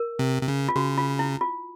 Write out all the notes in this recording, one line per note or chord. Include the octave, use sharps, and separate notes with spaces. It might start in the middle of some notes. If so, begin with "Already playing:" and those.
Already playing: A#4
C3
C3
C#3
F4
C#3 F#4
F4
E4
F4